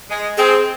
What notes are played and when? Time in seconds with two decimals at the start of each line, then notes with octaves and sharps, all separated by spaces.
0.10 G#3
0.37 C4 G#4